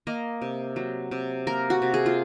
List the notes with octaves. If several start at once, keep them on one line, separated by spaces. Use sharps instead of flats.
A#3 D#5
C3
F#3
C3
A#3 A#4
F#4
C3
G#4
F4